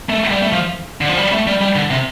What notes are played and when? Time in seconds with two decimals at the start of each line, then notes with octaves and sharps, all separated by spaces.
0.09 A3
0.31 G3
0.42 A3
0.53 F3
1.01 D3
1.09 F3
1.17 G3
1.32 A3
1.47 G3
1.61 G3
1.76 D3
1.90 C3